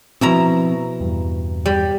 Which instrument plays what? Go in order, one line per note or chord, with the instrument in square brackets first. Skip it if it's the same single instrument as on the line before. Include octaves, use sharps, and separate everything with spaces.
[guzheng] B2 E4 A#5 [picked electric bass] F3 C4
[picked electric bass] E2 G2
[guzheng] G3